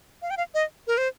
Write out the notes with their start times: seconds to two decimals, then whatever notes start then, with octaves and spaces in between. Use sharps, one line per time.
0.22 F5
0.30 G5
0.37 F5
0.54 D#5
0.87 A#4
0.98 C5